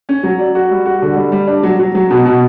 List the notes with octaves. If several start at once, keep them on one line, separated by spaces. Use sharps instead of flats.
C#4
F#3
D5
F#4
G3
F#4
D3
G3
G3
D4
F#3
F#3
F#3
B2
B2